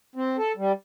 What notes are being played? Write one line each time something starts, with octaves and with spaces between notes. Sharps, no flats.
C4
A4
G3